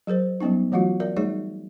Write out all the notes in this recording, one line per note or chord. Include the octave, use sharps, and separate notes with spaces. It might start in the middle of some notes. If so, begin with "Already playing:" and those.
F#3 G#4 A#4 C5
F#3 G3 B3 C#4 D#4
E3 F#3 A3 F4 F#4
A#4 D5 E5
G3 A3 D#4 G#4 C#5